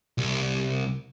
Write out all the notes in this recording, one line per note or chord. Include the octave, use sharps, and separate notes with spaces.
C2